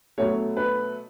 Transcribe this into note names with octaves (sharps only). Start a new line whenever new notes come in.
B2 F#3 A3 C#5
B4